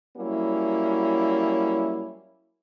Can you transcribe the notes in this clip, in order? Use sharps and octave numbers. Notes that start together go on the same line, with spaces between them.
F#3 G3 A#3 C#4 E4